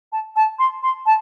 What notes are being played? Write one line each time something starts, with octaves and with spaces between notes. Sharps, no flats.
A5
A5
C6
C6
A5